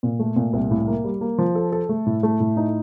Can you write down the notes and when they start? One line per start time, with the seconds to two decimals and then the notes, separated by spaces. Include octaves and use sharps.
0.03 A#2
0.19 A3
0.36 A#2
0.53 C2
0.71 A2
0.88 A#3
1.04 G3
1.21 A#3
1.38 F3
1.55 A4
1.72 A4
1.89 A3
2.06 A2
2.23 A3
2.40 A2
2.57 D#4